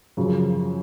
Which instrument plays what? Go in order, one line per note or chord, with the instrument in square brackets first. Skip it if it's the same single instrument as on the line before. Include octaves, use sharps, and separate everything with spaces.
[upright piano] F#2 C#3 F3